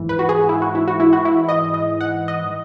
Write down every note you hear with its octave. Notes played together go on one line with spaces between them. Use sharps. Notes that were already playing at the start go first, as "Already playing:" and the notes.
Already playing: G#2 E3
B4
F#4
G#4
E4
F#4
E4
F#4
E4
F#4
E4
D#5
D#5
F#5
D#5